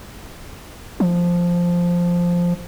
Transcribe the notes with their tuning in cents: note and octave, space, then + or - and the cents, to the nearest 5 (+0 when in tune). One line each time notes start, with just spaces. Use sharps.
F3 +0